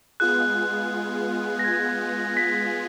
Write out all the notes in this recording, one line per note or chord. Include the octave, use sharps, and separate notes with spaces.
G#3 B3 F4 G#4 F#6
A#6
G#6
B6